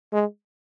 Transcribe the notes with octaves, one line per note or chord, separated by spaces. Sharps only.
G#3